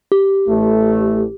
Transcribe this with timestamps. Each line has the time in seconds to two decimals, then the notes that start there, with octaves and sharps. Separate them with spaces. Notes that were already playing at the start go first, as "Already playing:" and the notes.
0.12 G4
0.48 A1 A3